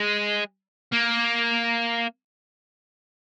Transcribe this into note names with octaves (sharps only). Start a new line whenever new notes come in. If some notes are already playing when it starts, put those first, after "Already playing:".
Already playing: G#3
A#3